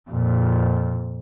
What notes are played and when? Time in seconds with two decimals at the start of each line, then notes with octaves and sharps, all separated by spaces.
0.10 F2 A#2